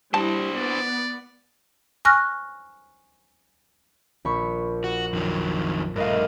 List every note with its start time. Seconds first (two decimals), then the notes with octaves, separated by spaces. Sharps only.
0.14 G3 D4 E4 C5 A5
0.55 B3 D5
2.05 G#5 C#6 F6 F#6 A#6
4.25 A#1 B5 C#6
4.84 F#4
5.13 F2 D#3 F#3
5.96 G2 A3 A#4 D#5 F5